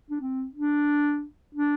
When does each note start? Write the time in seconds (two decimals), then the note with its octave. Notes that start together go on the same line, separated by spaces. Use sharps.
0.10 D4
0.21 C4
0.55 D4
1.55 D4